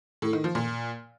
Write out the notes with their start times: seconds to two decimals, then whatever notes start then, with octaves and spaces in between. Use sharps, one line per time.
0.22 A2
0.33 D#3
0.44 F3
0.55 A#2